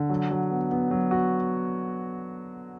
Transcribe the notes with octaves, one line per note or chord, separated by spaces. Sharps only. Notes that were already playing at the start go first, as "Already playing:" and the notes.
Already playing: D3
F#3
F#3
B3
B3
F#3
F#4